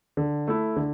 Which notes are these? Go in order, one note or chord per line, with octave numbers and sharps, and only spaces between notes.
D3
A3 E4
D3